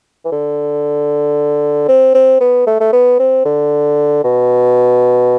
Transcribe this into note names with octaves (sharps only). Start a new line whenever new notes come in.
E3
D3
C4
C4
B3
A3
A3
B3
C4
D3
B2